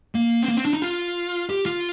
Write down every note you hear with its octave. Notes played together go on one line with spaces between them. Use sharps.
A#3
C4
A#3
C4
D4
D#4
F4
G4
F4